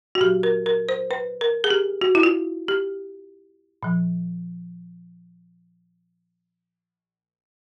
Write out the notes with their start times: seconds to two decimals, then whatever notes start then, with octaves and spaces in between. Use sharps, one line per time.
0.15 F#4
0.21 A#2 G4
0.24 F#3
0.43 A#4
0.66 A#4
0.89 C5
1.11 B4
1.41 A#4
1.64 G#4
1.70 G4
2.01 F#4
2.15 E4
2.23 F4
2.68 G4
3.83 A#2 F3